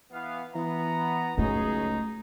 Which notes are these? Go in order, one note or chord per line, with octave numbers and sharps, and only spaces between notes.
E3 B3 F5
E3 B3 A#5
C#2 F#3 A3 D#4 G#4